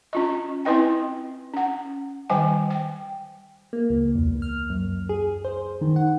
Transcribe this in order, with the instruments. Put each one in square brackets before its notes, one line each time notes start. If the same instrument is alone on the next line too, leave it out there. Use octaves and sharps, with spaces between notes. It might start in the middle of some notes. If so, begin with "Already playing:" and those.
[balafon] C#4 F4 D#5
C4 E4 B4 D#5 G5
C#4 F#5
D#3 G3 C5 G5 G#5
G5
[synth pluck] A#3
C#2
E2
F6
F#2
G#4
C5
D#3
F#5